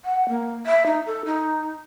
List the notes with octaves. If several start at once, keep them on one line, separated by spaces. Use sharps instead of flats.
F#5
A#3
E5
D#4
A4
D#4